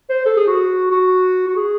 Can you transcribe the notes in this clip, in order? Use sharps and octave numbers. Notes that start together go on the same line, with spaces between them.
C5
A4
G#4
F#4
F#4
F#4
G#4